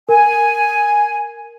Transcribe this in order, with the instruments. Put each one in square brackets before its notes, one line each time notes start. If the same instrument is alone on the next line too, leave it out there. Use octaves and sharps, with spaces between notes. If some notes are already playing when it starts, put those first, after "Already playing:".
[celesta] A#4 [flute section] G#5